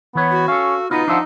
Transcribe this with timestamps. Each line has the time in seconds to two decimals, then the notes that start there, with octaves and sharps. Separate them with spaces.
0.15 E3 B3 C#5
0.31 F#4
0.48 C#4 A4 F5
0.91 B3 D#4 F4 F#4 B4
1.08 F3 D4 E5 F#5